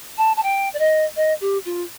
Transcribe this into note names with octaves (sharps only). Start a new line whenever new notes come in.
A5
A5
G5
D5
D#5
D#5
G4
F4